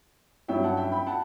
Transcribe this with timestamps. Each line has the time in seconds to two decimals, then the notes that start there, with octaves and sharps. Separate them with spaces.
0.48 G2 F#3 C#4 E5 G5
0.63 F#5 A5
0.77 E5 G5
0.92 G5 B5
1.07 F#5 A5